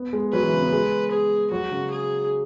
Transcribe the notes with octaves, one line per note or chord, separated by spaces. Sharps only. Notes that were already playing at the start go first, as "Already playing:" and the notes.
Already playing: B3
G#3
F#3 B4
E3
C#3
B3
G#3
G#4
F#3 F#4
C#3
G#4